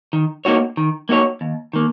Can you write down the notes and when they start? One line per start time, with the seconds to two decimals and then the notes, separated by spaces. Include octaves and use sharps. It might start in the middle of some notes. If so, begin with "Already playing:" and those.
0.13 D#3
0.45 A#3 D#4 F#4 C#5
0.77 D#3
1.09 A#3 D#4 F#4 C#5
1.41 D#2
1.73 D#3 A#3